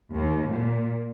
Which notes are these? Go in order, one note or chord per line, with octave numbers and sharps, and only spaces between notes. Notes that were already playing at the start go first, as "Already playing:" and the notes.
D#2
A#2